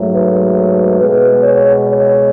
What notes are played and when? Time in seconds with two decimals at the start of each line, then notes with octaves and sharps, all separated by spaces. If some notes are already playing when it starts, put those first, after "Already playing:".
Already playing: G#2 F#3 A3
0.10 B4
0.97 B2 G#3 B3 B4
1.40 C#5
1.84 C#5